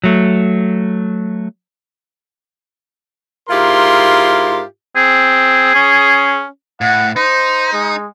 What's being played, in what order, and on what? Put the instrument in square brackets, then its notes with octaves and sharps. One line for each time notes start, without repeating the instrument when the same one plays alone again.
[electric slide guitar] F#3 A3
[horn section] G#2 E4 F4 G4 A#4 C6
[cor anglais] C4 [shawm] G#4
[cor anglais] C#4
[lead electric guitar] A2 [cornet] F#5
[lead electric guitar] D#4 [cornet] C5
[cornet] G#3